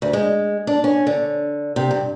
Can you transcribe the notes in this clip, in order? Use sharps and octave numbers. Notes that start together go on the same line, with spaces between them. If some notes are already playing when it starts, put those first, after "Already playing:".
D2
G#3
D4
C#4
D3
C3
G2